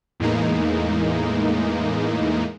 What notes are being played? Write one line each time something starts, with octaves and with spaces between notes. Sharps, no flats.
E2 A2 E3 G#3 A#3 D#4